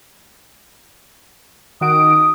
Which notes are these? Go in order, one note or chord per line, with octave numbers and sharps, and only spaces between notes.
D#3 F#4 D#6 D7